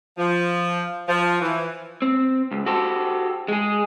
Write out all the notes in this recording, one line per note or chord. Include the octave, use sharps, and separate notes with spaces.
F3
F3
E3
C4
C#2
F#4 G4 A4 C5
G#3 G#4